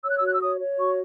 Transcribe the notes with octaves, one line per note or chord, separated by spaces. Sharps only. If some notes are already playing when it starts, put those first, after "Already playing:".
C#5 E6
F#6
E6
F#4 F#6
E6
C#5 D#6
C#5
F#4 C#6